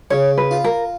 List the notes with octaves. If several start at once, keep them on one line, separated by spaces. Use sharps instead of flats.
C#3 C#5
B4
F4
A#4